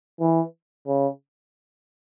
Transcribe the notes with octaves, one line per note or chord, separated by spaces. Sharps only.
E3
C#3